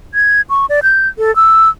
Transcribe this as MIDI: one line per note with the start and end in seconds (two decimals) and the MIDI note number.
0.14 0.41 92
0.50 0.66 85
0.69 0.80 74
0.83 1.08 91
1.18 1.34 69
1.36 1.69 88